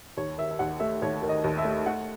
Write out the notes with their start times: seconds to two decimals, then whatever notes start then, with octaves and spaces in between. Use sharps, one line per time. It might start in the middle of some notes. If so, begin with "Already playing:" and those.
0.17 D#2 C#5
0.38 D#3 E5
0.51 E5
0.59 D#2 F#5
0.80 A3 E5
1.02 D#2 C#5
1.23 D#3
1.29 D#5
1.44 D#2
1.58 E5
1.65 A3
1.86 A3 F#5